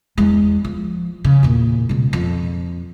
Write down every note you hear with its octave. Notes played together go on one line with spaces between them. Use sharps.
E2 G#3
F3
C#3
E2 A#2
C#2 B2
F2